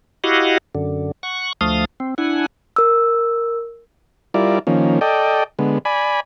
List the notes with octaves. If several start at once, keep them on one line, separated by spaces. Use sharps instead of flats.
E4 F#4 G4 D#5 F5 F#5
F#2 D3
F#5 C#6
D2 F3 A3 F5 D#6
C4
D4 E4 F#5 G#5
A#4 E6
G3 E4 F4 A#4 D5
D#3 F3 A#3 C#4
A4 D5 D#5 G5
D3 G#3 B3
D5 G#5 B5